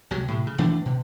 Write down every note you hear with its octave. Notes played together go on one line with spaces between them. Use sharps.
C#2 C3 F#3
A2 C3
C#3
E1 E3 A3 D4
B2